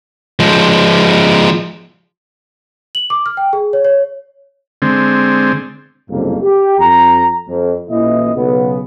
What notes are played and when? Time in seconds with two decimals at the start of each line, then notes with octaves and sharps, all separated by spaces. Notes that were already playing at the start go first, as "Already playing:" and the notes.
0.40 F3 G#3
2.95 F#7
3.10 D6
3.26 F6
3.37 G5
3.53 G#4
3.73 C#5
3.85 C#5
4.82 D3 G#3 C4
6.10 F#1 C2 F2 G#2 A#3
6.43 G4
6.79 F2 A#5
7.49 F2
7.90 A1 A#2 E3 E4 D#5
8.35 B1 C#3 B3